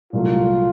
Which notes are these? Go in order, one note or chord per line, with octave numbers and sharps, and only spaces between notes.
C2 A#2 F#3 A3 F4